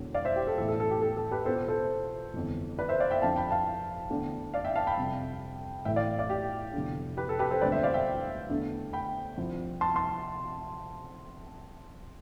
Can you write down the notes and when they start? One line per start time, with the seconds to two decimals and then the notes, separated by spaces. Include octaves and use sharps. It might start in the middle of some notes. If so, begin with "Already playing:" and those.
Already playing: E1 E2 D3
0.14 D5 F5
0.25 C5 E5
0.36 G4
0.47 A4
0.58 A2 E3 B3 E4 A4
0.69 A4
0.80 A4
0.91 G4
1.02 A4
1.17 A4
1.31 G4 B4
1.46 E2 B2 B3 F4 A4 C5
1.68 A4 C5
2.34 G1 F2 E3
2.79 B4 D5
2.89 C5 E5
3.00 D5 F5
3.11 E5 G5
3.22 F2 D3 F3 F5 A5
3.36 G5 B5
3.51 F5 A5
4.10 E2 D3 A3 D4
4.54 D5 F5
4.65 E5 G5
4.75 F5 A5
4.87 G5 B5
4.97 F2 C3 G3
5.85 A1 A2 E3 E5 G5
5.96 D5 F5
6.19 D5 F5
6.30 G4
6.73 F1 E2 D3
7.17 G4 B4
7.29 A4
7.39 G4 B4
7.51 A4 C5
7.61 E1 D2 D3 G3 C4 B4 D5
7.72 C5 E5
7.83 D5 F5
7.94 E5 G5
8.49 E2 D3 A3 D4
8.93 G5 B5
9.37 C2 C3 F3 C4
9.81 A5 C6
9.95 A5 C6